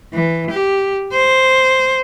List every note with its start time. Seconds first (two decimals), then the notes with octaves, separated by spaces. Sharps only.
0.13 E3
0.50 G4
1.13 C5